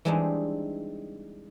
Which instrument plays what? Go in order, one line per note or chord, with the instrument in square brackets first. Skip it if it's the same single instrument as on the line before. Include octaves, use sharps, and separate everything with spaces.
[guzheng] E3 G3 G#3 C4 D4 D#4